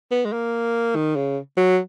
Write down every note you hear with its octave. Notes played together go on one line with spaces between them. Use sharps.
B3
G#3
A#3
D#3
C#3
F#3